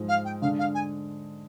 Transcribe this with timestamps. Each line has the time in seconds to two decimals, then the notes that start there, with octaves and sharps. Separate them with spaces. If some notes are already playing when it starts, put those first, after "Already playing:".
Already playing: G#2 F3 G#3
0.09 F5
0.25 G5
0.42 D3 G#3 D4 F5
0.59 F5
0.75 G#5